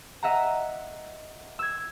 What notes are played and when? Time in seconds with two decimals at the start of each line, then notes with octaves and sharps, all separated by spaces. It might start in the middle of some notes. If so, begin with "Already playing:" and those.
0.23 D#5 E5 F#5 A#5
1.59 E6 G#6